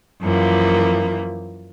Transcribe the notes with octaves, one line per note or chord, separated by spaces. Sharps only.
F#2 E3 F3 A#3